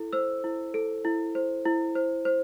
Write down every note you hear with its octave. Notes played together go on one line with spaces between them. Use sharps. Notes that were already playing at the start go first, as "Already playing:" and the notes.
Already playing: E4 A4
C5 E6
E4
A4
E4
C5
E4
C5
C5